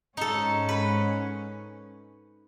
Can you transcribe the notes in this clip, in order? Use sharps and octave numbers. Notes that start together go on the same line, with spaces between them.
G#2 C#4 D#4 A4
B4